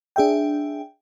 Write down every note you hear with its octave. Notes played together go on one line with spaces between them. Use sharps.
D4 G#4 E5 G5